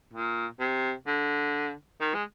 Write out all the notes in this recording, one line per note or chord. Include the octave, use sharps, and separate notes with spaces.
A#2
C3
D3
D#3
G#3